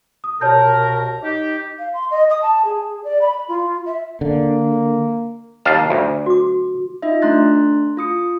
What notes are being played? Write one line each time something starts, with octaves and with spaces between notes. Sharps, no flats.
D#6
C2 B2 A#4 C#5 A5 G6
D#4 G4
F5
C6
D#5
D#6
A5
G#4
D5
B5
F4
E5
D3 A#3
D#2 F5 A5
D2
F#4 D6
D#4 F4 D#5 E5
A3 D4 A#5 C6 F#6 A6
F4 D#6 C#7